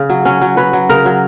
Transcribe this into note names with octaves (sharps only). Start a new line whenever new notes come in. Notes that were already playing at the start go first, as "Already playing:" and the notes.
Already playing: C#3
F#3
F#3 C#4
F#3
F#3 B4
F#3
C#3 A#4
F#3